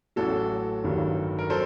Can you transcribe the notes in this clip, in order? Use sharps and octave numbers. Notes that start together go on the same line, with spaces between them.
A1 A2 F#3 F#4 A4
G1 G2 D#3 F#3
A#4
F#3 A4 C5